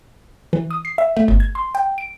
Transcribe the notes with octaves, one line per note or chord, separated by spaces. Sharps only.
E3
D#6
C7
E5
A3
G1
G#6
C6
G5
D7